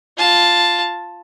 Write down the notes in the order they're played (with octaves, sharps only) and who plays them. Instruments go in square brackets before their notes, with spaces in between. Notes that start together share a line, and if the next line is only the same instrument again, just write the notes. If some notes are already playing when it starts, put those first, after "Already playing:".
[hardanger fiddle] F4 A5